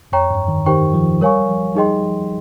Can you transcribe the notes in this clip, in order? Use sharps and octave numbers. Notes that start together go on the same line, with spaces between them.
F2 C#5 G5 A#5 C#6
G2
D#3
D#3 G4 C5 G5 C#6
F3
G3 A#4 C#5 F5 G#5 C#6
F3
G3 D#4 G#4 D#5 G5 C6
F3